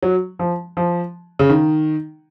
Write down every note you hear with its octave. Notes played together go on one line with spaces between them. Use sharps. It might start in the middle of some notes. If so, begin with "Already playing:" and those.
F#3
F3
F3
C#3
D#3